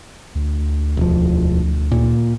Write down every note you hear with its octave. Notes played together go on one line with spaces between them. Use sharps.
D2
E1 F3
A#2